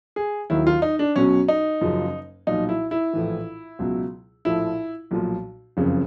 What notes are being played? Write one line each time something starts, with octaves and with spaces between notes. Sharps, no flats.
G#4
D#2 D#3 F#3 E4
F4
D#4
D4
B1 B2 F#3 C#4
D#4
F#1 F#2 C#3 F3
B1 A#2 F3 D#4
E4
E4
A#1 A2 E3
C#2 B2 F#3
A#1 A2 F3 E4
B1 A#2 F3
F#1 F2 C#3